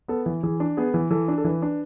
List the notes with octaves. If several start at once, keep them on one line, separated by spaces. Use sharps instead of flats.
B3 A4
E3
E3 G#4
D4
B3 G#4
E3
E3 A4
D4
A4
E3 B4
D4